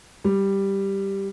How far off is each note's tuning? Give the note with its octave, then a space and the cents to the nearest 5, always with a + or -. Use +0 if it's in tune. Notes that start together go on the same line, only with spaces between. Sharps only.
G3 +0